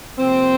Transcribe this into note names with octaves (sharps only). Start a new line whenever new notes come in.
C3 F3 A#3 C4